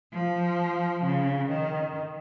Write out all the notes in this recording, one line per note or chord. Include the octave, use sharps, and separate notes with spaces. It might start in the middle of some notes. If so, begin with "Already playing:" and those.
F3
C#3
D#3